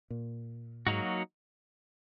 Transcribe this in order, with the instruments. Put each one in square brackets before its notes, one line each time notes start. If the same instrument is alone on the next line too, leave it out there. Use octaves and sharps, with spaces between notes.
[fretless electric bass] A#2
[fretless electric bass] G#2 [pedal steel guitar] F#3 A#3 D#4 F#4